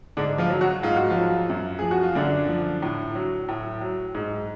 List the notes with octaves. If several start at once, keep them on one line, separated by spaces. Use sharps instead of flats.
G#2 D3 D4
F3 F4
F#3
F#3 F#4
G#2 F4
F#4
F3 F4
F#3
F#2
F3 G#4
F#4
F4
F#2 D3 D4
F3
A2
F#3
A2
F#3
G#2